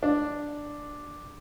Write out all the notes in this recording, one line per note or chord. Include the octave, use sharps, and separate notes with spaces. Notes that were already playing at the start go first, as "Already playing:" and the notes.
D4